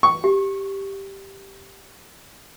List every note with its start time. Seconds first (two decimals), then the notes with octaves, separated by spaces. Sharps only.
0.03 C#6
0.24 G4